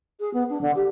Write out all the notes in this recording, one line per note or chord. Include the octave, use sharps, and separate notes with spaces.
G#4
B3
D4
D3
G4